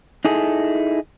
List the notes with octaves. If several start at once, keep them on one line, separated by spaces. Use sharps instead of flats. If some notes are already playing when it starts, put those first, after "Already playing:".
D#4 E4 G#4 A4